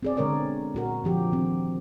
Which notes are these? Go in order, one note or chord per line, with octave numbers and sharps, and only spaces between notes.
C4 G#4 D5
B2 D3 G#3 A#4 C#5 D5
A#2 F#4 A#4
D3 F3 G4
D#3 C4